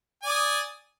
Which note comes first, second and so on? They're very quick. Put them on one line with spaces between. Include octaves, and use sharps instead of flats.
G#5 D5 D#6